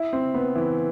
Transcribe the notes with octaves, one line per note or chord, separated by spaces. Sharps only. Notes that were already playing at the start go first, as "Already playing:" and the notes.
Already playing: E4
C4
B3
E3